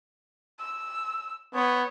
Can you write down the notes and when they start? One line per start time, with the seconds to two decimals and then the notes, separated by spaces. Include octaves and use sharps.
0.59 E6
1.54 B3 C#5